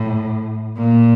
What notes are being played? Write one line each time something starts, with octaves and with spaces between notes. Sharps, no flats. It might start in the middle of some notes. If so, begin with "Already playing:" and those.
Already playing: A2
A#2